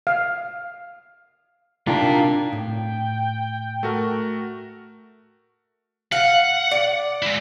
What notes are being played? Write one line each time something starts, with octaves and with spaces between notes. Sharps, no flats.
F5
C3 D4 D#4 F4 A#4 G5
A2 G5
A3 F#4 A#4
F5 F#5
D5
G#3 E4